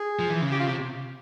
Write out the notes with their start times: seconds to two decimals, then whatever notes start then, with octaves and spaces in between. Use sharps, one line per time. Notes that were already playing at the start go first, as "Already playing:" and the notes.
Already playing: G#4
0.19 F3
0.30 E3
0.41 C#3
0.52 G4
0.60 F4
0.68 C3 G4